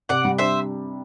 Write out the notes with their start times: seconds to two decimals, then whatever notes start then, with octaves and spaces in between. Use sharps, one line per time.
0.09 C3 D5 F#5
0.25 G3
0.38 D4 C5 E5